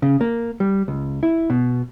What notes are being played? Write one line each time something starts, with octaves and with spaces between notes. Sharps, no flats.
C#3
A#3
G3
C#2
E4
B2